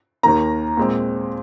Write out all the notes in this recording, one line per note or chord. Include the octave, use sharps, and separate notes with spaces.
D#2 D#3 A#3 A#5
A#2 G#3 C4